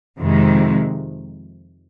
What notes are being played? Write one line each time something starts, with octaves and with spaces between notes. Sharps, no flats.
F2 C3 D#3 G#3